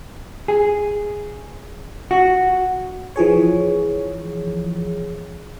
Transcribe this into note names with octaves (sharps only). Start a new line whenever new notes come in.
G#4
F#4
E3 F3 G#4 C#5